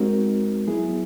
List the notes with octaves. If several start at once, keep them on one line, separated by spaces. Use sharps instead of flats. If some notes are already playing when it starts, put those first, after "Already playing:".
Already playing: G#3 C4 D#4 F#4 A#4
F#3 B3 E4 G#4